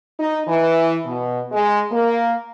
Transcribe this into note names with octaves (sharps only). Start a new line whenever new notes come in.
D#4
E3
B2
G#3
A#3